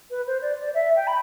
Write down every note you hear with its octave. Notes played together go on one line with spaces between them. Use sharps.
B4
C5
D5
D5
E5
G5
B5